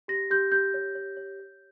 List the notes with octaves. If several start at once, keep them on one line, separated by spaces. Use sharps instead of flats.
G4 A#6
G4 G6
G4 G6
C#5
C#5
C#5
C#5